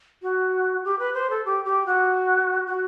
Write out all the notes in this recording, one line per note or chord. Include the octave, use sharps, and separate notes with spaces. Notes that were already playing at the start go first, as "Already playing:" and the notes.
F#4
G4
B4
C5
A4
G4
G4
F#4
F#4